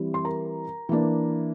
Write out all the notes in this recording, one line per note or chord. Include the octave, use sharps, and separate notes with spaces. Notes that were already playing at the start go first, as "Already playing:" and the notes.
Already playing: E3 G3 C4
C6
A#4 A#5
E3 A#3 D4